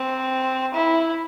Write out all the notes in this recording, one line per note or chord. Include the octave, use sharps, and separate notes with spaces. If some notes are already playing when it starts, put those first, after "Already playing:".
Already playing: C4
E4